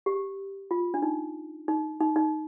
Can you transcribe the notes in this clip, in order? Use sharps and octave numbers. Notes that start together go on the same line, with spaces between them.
G4
F4
D4
D#4
D#4
D#4
D#4